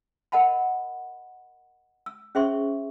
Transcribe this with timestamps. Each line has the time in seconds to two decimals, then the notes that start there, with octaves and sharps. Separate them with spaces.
0.32 A#4 D#5 F#5 A5 B5
2.06 E6
2.35 C#4 G#4 C5 E5 C6 C#6